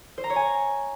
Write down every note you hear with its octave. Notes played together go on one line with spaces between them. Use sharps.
C5
A#5
C#5
G#5